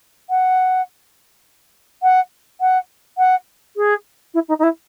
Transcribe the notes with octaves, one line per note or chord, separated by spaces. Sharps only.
F#5
F#5
F#5
F#5
G#4
E4
D#4
D#4
E4